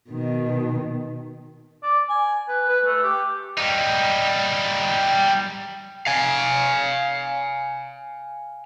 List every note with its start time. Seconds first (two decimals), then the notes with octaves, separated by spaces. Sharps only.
0.10 B2 D#3
1.83 D5
2.09 G#5
2.48 B4
2.69 B4
2.85 A3
3.03 G4
3.58 G3 D#4
6.07 F5 G#5